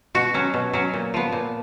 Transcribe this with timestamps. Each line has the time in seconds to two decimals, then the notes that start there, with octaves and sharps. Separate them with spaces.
0.15 B2 F#4
0.34 F#3 C#4
0.54 B2
0.73 F#3 C#4
0.93 A#2
1.14 F3 B3
1.32 A#2